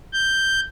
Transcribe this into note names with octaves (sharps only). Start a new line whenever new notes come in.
G6